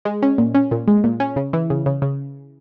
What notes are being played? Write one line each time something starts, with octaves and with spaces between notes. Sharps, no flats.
G#3
C#4
A#2
C#4
A#2
G#3
A#2
C#4
C#3
E3
C#3
C#3
C#3